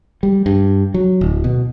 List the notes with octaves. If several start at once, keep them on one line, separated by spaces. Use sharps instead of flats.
G3
G2
F#3
D1
B2